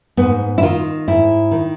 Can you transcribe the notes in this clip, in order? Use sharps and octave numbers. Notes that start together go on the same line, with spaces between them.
G#2 B3
E4
D#3 F4
G#2 E4
D#3